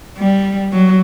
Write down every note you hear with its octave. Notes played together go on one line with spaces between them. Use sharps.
G3
F#3